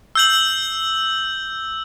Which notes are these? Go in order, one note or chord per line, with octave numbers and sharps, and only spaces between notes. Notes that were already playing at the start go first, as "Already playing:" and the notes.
E6 G6 F#7